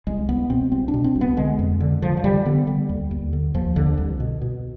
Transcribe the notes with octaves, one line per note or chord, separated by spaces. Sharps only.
C2 G#3
C2 B3
B2 C4
C2 C4
D4
B2
C4
C2
B3
D3 G#3
F2
D3
D3 F3
F3
D3 G3
D3 B3
D3 G3
D#2
D#2
D3
D#2 F3
D#2 D3
C2
B2
B2